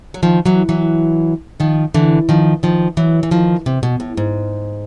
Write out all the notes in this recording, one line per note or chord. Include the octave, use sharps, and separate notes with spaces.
F#3
D#3 F3
E3 F#3
E3 F#3
D#3 F3
D3 E3
D#3 F3
D#3 F3
E3 F#3
E3
D#3 F3
C3
B2
A2
G#2